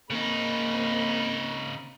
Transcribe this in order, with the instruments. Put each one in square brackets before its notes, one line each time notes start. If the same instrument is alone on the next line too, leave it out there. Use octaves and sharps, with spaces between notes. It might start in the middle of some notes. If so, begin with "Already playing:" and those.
[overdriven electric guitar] C#3 D#4 [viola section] A#3 C4 B5